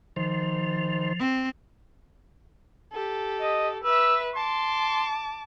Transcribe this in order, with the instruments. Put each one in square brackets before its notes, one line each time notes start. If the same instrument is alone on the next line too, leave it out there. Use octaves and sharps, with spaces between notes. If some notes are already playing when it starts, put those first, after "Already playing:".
[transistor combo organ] D#3 C5 [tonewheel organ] F3
[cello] C4
[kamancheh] G4 A4
[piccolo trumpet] D#5
[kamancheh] B4 E5 [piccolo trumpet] E6
[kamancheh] A5 D6 [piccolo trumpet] C6